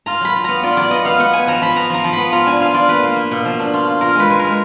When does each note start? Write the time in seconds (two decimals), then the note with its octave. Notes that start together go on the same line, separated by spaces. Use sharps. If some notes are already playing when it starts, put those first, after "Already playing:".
0.06 F4 A#5
0.21 F#3 B5
0.35 F4
0.44 B3 A#5
0.63 F4 D5
0.76 F#3 D5
0.91 B3 D#5
1.05 B3 F5
1.20 B3 F#5
1.33 B3 G#5
1.47 F3 A#5
1.61 F3 B5
1.76 B3 A#5
1.89 F3 A#5
2.04 F3
2.13 B3 B5
2.32 F4 A#5
2.46 D4 G#5
2.60 F4 F5
2.74 F4 D5
2.88 A#3 B4
3.03 A#3
3.16 A#3
3.31 B2
3.45 F3
3.59 D4
3.74 F4
3.87 F4
4.01 F4 A#4
4.15 G#3 B4
4.30 G#3
4.39 A#4
4.44 G#3